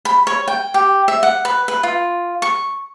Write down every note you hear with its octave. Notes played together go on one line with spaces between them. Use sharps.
B5
C#5
G5
G4
E5
F#5
B4
B4
F4
C#6